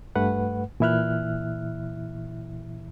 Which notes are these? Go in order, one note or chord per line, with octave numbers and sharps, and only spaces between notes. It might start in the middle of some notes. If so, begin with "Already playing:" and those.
G2 A3 B4 F#5
A#2 E3 E4 E5 F6 F#6